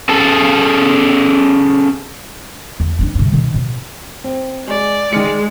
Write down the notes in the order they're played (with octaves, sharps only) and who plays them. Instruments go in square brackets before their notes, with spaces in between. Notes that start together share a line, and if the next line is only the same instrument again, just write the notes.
[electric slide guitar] C#4 G#4 A4 A5
[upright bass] E2
C#4 D4
G2 C3
B2 D#3
B2
[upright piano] C4
[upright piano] G#3 [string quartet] D5
[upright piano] D#3 F6 C#7 [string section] G#3